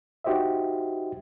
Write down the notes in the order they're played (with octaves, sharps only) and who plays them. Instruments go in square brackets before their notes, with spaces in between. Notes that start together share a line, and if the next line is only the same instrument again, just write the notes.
[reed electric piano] D#4 F#4 G4 C5 D#5 E5